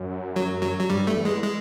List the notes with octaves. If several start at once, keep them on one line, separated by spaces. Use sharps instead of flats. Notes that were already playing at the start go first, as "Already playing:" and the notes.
Already playing: F#2
F#3
F#3
F#3
G2 G3
A3
E2
G#3
G#3